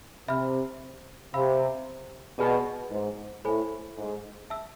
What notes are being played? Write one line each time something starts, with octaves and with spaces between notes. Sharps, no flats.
C3 E5 B5 F6
C3 F5 B5 E6
B2 G#4 D5 G#5 B5 F6
G#2
A2 A4 C5 G#5 B5
G#2
E5 A5 E6